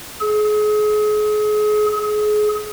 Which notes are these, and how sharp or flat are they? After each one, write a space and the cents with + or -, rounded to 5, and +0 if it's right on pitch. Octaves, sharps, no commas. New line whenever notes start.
G#4 +35
G#4 +30